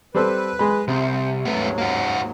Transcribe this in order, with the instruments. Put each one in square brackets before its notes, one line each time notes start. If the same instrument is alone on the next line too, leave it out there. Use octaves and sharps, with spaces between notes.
[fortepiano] G3 C4 A4 [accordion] B4
[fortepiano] G#3 B5
[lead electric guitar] C2 [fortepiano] C3 [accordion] C5
[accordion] D#2 G#2 F#3 [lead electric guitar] A3 B3
[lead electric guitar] A#3 F#4